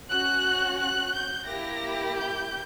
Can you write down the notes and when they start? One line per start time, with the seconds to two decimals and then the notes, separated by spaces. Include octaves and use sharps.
0.10 C#4 F#4 F#6
0.80 F#6
1.14 G6
1.48 A#3 E4 G4 A#6
2.16 G6